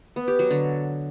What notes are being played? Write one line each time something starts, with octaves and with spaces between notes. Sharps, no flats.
B3
G4
F#3
D3